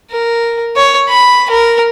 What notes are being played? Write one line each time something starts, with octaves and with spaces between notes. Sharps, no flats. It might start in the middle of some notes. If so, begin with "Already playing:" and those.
A#4
C#5
B5
A#4